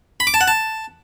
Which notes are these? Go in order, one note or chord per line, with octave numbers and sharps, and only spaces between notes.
B5
D6
A5
F#5
A5